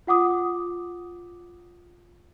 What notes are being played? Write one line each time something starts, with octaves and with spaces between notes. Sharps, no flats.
F4 F#5 D6 D#6